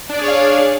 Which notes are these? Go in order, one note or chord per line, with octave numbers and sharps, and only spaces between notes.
D4 G#4 C#5 D5 F5